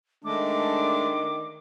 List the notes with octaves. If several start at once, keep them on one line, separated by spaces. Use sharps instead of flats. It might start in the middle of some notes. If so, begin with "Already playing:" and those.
D#3 G#3 A3 D4 D6